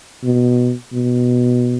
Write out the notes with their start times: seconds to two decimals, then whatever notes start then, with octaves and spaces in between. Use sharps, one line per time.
0.24 B2
0.93 B2